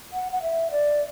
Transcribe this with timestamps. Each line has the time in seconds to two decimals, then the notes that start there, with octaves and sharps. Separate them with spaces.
0.13 F#5
0.32 F#5
0.43 E5
0.71 D5